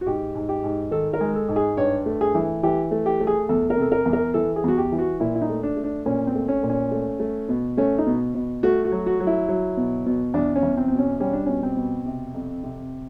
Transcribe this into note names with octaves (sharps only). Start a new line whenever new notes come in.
F#4
G#2 G4
G#2
G4
G#2
D#3 A4
A#4
G#3
A4
G#2
G#4
G2 C#5
A3
G#4
E3
E3 G4
A3
G4
A3
G#4
E2 A4
A#4
C3 A4
A#4
E2
A#4
E3 A4
G#4
E2 F#4
G4
E3
F#4
A#2 E4
E4
D#4
A3
D4
A3
D4
A#2 C#4
C4
A3
C#4
A#2
C#4
A3
A3
B2
A3 C#4
D#4
B2
B2
A3 F#4
F#4
F#3
F#4
F#3
E4
F#3
B2
B2
E2 D4
C#4
E2
C4
B2 C4
C#4
G3 C#4
D4
B2 C#4
C4
B2
C3
F2
C3